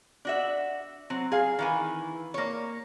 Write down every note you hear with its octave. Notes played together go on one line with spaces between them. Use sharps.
D4 F#4 E5
F#3 C4
G#4 F5
D#3 E3 G#5
A#3 C#5